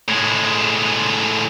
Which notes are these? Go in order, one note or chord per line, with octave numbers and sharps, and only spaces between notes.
A2 G#3